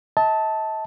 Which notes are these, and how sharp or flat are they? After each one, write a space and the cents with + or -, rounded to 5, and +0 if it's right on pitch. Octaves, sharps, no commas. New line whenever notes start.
D#5 +45 A5 +0